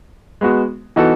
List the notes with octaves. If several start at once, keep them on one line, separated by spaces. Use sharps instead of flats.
G#3 B3 F#4
E3 B3 D#4 F#4 A4